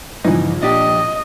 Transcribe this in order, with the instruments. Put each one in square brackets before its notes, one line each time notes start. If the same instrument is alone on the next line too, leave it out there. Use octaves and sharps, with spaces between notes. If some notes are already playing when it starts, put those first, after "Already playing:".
[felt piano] A#1 [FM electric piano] G2 C#3 [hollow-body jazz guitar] E3 D#4
[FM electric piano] A#2 [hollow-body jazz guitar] D4 G4 [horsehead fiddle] D#5